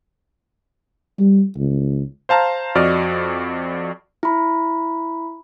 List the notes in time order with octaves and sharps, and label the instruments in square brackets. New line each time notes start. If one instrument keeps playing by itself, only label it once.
[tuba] G3
C#2
[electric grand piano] C5 F5 A5 A#5 F6
F2 F#4 D5 D#5 F6
[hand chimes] E4 B5